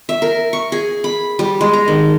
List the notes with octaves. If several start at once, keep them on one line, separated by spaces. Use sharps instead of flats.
E5
A#4
C#6
G#4
B5
G3
G#3
A#5
D#3